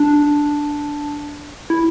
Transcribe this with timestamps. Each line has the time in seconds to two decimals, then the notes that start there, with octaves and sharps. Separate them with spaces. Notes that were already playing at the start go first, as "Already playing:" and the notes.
Already playing: D4
1.70 E4